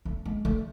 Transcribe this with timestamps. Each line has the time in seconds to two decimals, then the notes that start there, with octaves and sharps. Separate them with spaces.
0.05 A3
0.25 G#3
0.45 A3